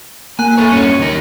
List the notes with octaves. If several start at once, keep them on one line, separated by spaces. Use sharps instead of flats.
A#3 G#5 F#6
A4 C#5
G2 C#4 C#7 D#7
D#2 D#4